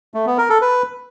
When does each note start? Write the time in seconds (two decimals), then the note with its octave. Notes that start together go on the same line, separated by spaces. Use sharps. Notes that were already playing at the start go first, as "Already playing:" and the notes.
0.14 A3
0.26 B3
0.38 A#4
0.50 A4
0.61 B4